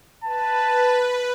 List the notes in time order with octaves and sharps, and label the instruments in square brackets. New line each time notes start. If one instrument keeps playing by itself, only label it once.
[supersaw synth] B4 [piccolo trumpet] A5